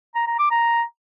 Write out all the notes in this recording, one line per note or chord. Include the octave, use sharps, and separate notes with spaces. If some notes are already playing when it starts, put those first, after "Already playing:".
A#5
A#5
D6
A#5